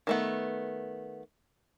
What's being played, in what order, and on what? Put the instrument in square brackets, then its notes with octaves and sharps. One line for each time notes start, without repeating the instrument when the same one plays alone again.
[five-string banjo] D#3 A3 B3